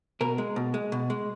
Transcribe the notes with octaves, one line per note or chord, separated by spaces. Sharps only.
B2 A#4
G#3
B2
G#3
B2
G#3